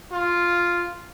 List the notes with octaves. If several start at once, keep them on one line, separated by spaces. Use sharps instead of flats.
F4